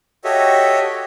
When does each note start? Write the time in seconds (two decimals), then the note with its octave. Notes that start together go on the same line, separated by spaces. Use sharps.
0.24 F#4 G4 A4 C#5 D#5 E5